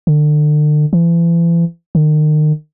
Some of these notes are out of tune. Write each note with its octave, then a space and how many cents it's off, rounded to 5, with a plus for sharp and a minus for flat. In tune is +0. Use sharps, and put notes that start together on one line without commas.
D3 +35
E3 +40
D#3 -35